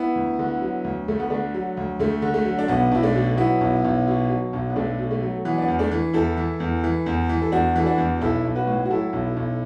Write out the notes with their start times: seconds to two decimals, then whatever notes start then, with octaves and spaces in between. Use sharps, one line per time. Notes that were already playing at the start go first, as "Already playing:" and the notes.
Already playing: B3 E4
0.15 D2
0.39 D3
0.62 F#3
0.84 D2
1.08 D2 A3
1.20 B3
1.30 D3 A3 D4
1.54 F#3
1.77 D2
1.99 D2 A3
2.22 D3
2.34 A3
2.45 F#3
2.59 D4
2.68 B1 B3
2.92 B1 E4
3.03 A3 D4
3.15 B2
3.38 F#3 B3 E4
3.61 B1
3.84 B1
4.07 B2
4.30 F#3
4.53 B1
4.70 B3
4.76 B1 A3 D4
4.99 B2
5.11 A3
5.22 F#3
5.45 E3 B3
5.58 D4
5.62 B3
5.68 E2
5.79 A3 D4
5.91 E3
6.14 E2 E4 A4
6.37 E3
6.60 E2
6.84 E3
7.06 E2
7.29 E3
7.42 A4
7.52 E2 D4 F#4
7.76 E3 A4
7.86 D4 F#4
7.98 E2
8.21 B1 E4 A4
8.45 B1
8.55 F#4 B4
8.67 A2
8.85 F#4
8.90 F#3 E4 A4
9.13 B1
9.37 B1